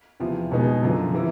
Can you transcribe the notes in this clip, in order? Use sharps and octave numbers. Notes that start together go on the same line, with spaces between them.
E2 C3 F3
B2 G#3 B3 D#4 G#4
F#2 D3 F3
C3 E3